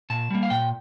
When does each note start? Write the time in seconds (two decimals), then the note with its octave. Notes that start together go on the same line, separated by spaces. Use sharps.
0.10 A#2 A5
0.31 G3 A#3
0.43 F5
0.50 A#2 G5